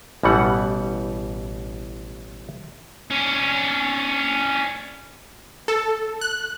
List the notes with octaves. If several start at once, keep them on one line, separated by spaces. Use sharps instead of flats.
A1 B2 E3 G3 F#5
C#4 D4
A4
F#6